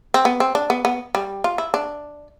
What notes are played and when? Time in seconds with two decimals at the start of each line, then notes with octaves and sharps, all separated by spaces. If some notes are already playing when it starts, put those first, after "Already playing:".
0.14 C4
0.25 B3
0.40 C4
0.55 D4
0.70 B3
0.85 B3
1.15 G3
1.44 F4
1.58 E4
1.74 D4